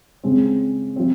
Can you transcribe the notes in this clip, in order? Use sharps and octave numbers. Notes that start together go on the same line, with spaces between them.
C#3 G#3 C4
F3 C4